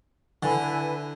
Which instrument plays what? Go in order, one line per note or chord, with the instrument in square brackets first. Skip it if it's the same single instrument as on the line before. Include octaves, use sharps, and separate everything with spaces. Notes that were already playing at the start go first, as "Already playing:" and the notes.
[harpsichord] D3 [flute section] E4 B4 G#5